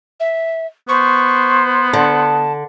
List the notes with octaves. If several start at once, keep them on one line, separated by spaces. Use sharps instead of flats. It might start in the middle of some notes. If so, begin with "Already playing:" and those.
E5
B3 C5 C#6
D3 A5